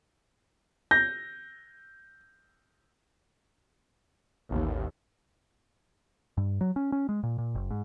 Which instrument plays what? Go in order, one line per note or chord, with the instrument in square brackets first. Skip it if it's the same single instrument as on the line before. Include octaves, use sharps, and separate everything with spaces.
[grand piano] G6 A#6
[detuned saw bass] A1 [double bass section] D#2
[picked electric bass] G2
F#3
C#4
C#4
G#3
A#2
A#2
F#1
G#2